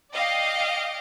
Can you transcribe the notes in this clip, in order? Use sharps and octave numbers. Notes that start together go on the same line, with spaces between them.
D5 D#5 F5 G5 D6